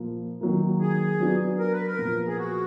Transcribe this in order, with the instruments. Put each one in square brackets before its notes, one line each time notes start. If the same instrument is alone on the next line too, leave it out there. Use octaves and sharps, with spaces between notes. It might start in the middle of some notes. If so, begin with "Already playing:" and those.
Already playing: [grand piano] A#2 F3 A#3
D#3 F#3 A#3
[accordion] G#4
[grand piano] F#3 B3 D4 F#4
[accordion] A#4
B4
A#4
[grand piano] A#2 F3 B3 F4
[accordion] G#4
F#4